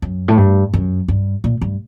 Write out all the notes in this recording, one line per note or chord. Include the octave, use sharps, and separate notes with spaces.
F#2
A2
G2
F#2
G2
A#2
G2